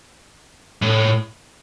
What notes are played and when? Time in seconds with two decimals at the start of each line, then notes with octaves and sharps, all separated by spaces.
0.82 A2